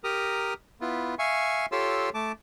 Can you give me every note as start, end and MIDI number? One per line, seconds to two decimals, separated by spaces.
0.04 0.54 67
0.04 0.54 70
0.04 0.54 82
0.04 0.54 87
0.81 1.15 59
0.81 1.15 64
0.81 1.15 65
1.19 1.66 76
1.19 1.66 77
1.19 1.66 80
1.19 1.66 85
1.72 2.10 65
1.72 2.10 67
1.72 2.10 69
1.72 2.10 73
1.72 2.10 84
1.72 2.10 88
2.14 2.32 57
2.14 2.32 81
2.14 2.32 86